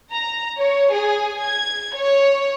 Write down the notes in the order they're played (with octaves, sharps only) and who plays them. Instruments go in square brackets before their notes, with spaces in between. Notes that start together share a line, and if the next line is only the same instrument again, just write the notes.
[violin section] A#5
C#5
G#4
G#6
C#5